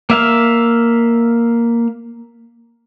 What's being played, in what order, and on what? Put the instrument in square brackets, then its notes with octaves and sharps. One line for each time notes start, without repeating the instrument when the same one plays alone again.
[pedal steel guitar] A#3 E5 F5